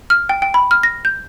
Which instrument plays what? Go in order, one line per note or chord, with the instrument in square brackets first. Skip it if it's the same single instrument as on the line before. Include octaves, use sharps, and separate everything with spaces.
[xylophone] F6
G5
G5
B5
F6
A#6
G6